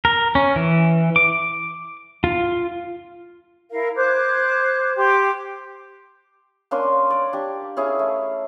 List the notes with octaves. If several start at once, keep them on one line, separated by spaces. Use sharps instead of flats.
A#4
C#4
E3
D6
F4
E4 A#4 F5
C5 D6 F#6 G#6
G4 C6 D6
A#3 C#4 D4 C6
C#5 D5
D4 G4
C#4 E4 G#4 F5
A3